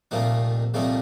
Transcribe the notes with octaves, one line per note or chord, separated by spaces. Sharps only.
C2 A#2 F3 A3 D#4
C2 A#2 F3 A3 D#4